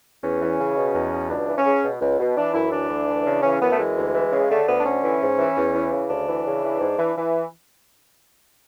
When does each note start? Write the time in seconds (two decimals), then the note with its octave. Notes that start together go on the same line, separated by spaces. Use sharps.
0.23 E2 C#4
0.41 E3
0.59 C#3
0.76 B2
0.95 E2
1.12 B2
1.29 C#2 D4
1.47 E3
1.57 C#4
1.65 C#3
1.83 B2
2.01 C#2
2.19 B2
2.37 E3 D4
2.54 F#2 E4
2.72 E3 D4
2.90 D2
3.08 E3
3.25 C#3
3.43 E3 C#4
3.61 F#2 B3
3.71 A3
3.79 E3 G#3
3.96 D2
4.14 E3
4.32 C#3
4.50 D3 A3
4.67 D2 B3
4.80 D4
4.85 D3 C#4
5.03 E3
5.21 G#2
5.38 E3
5.56 E2
5.74 E3
5.92 C#3
6.09 D2 D4
6.28 E3
6.46 C#3
6.63 E3
6.81 G#2
6.99 E3
7.16 E3